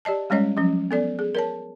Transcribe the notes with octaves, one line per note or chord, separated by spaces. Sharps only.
G4 D5 D#5 A5
G3 G#3 C#4 C#5 D#5
F3 F#3 C#4
B3 A4 D5
G#4
A#4 C#5 A5